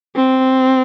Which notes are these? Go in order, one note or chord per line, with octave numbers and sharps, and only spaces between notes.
C4